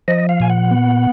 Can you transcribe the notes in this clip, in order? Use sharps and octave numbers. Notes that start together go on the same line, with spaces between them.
F3 D#5
F5
A#2 G#5
F#5
B3